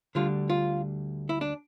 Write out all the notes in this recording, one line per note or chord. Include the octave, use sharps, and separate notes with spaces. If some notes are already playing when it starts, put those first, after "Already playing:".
D2 D3 G3 F4
F4
E4
D4